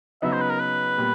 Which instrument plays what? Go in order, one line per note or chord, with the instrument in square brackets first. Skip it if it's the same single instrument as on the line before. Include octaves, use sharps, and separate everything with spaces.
[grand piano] C#3 F#3 B3 D#4 [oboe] E5
[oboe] C5
B4
A#4
B4
[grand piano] A#2 G3 B3